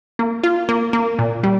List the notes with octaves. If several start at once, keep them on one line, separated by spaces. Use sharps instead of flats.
A#3
F4
A#3
A#3
A#2
G3